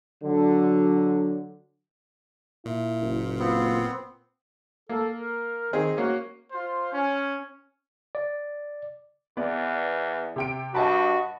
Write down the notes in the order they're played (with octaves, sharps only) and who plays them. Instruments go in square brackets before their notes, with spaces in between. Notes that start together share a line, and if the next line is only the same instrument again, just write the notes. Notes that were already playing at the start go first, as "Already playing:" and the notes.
[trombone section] D3 F#3
[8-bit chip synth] A#2 [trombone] E4
[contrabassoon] F#1
[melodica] B3 C4 [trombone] F4
[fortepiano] A#3 [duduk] A4
[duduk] A#4
[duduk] D#3 [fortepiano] C4 D#4 G#4
[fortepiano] A#3 C#4 [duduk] F#4
[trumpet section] F4 C5
C#4
[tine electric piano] D5
[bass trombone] E2 [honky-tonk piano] B3 D5
[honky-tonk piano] C3 G5 D7
[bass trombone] G2 [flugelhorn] F#4 [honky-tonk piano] D#5 A5 B5